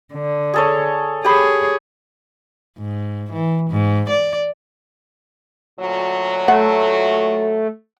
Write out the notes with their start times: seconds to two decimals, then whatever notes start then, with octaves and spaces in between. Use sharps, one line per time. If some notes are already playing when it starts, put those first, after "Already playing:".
0.14 D3
0.54 G#4 A4 C#5
1.24 G4 G#4 C#5 B5
2.79 G#2
3.33 E3
3.70 G#2
4.10 D5
5.79 D2 A#2 F#3
6.48 A3 F#5